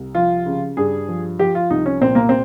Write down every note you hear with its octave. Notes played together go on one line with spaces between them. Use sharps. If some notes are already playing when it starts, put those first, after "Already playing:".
Already playing: C2
F3 F4
C#3
G2 G#4
F3
F3 G4
F4
C2 D#4
C#4
A#2 C4
A#3
C4